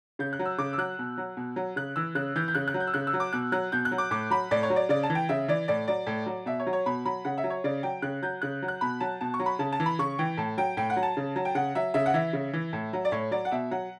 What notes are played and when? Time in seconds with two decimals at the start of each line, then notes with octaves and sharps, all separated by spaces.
0.19 C#3 G6
0.33 F#6
0.39 F#3
0.46 E6
0.58 C#3 D6
0.73 E6
0.78 F#3 F#6
0.99 B2
1.18 F#3
1.37 B2
1.56 F#3
1.76 C#3 F#6
1.96 E3 E6
2.15 C#3 F#6
2.36 E3 G6
2.48 G6
2.55 C#3 F#6
2.68 F#6
2.74 F#3
2.80 G6
2.87 E6
2.94 C#3 F#6
3.07 E6
3.13 F#3
3.20 D6
3.33 B2 F#6
3.52 F#3 F#6
3.72 B2 G6
3.85 F#6
3.91 F#3
3.98 D6
4.11 A2 D6
4.30 F#3 B5
4.51 A2 D5
4.63 C#5
4.70 F#3
4.76 D5
4.89 C#3 D5
5.03 A5
5.10 E3
5.15 G5
5.29 C#3 E5
5.48 E3 D5
5.68 A2 D5
5.87 F#3 D5
6.07 A2
6.26 F#3
6.46 B2 E5
6.60 C#5
6.67 F#3
6.73 C#5
6.86 B2 B5
7.05 F#3 B5
7.25 C#3 F#5
7.38 E5
7.44 F#3
7.50 C#5
7.64 C#3 D5
7.83 F#3 G5
8.02 C#3 F#6
8.22 F#3 G6
8.42 C#3 F#6
8.62 F#3
8.68 F#6
8.81 B2 B5
9.00 F#3 A5
9.21 B2 A5
9.34 C#6
9.39 F#3
9.46 B5
9.59 C#3 A5
9.72 A5
9.80 E3
9.86 B5
9.99 C#3 C#6
10.19 E3 G5
10.37 A2 A5
10.58 F#3 G5
10.77 A2 G5
10.90 F#5
10.96 F#3
11.03 A5
11.17 C#3
11.36 F#3
11.45 G5
11.55 C#3 F#5
11.75 F#3 E5
11.94 C#3 E5
12.06 F#5
12.14 E3 E5
12.33 C#3
12.53 E3
12.73 A2
12.93 F#3
13.05 D5
13.12 A2 C#5
13.31 F#3 D5
13.45 F#5
13.51 B2 E5
13.71 F#3 F#5